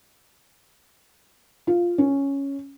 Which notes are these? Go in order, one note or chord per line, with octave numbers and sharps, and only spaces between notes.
F4
C#4